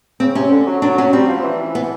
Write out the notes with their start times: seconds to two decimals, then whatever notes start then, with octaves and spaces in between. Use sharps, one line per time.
0.20 C#3 C4
0.35 C3 C#4
0.52 D3
0.67 F#3
0.82 F#3 D4
0.98 F#3 C#4
1.13 G3 C4
1.29 F3
1.44 E3
1.75 B3